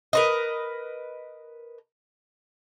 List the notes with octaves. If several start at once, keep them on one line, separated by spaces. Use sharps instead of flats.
A#4 B4 D#5